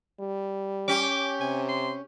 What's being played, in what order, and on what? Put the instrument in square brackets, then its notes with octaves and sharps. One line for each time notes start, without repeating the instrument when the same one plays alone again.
[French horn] G3
[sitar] C#4 G4 [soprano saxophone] D6
[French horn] C3 [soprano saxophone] G#5
[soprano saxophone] C6